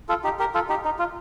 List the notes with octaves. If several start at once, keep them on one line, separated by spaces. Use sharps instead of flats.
F4 A4
D#4 G4
G4 A#4
F4 A4
D#4 G4
D#4
F4